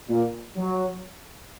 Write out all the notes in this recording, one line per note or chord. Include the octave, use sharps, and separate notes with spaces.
A#2
F#3